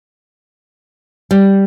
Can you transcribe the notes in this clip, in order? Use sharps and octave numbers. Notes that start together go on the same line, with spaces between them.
G3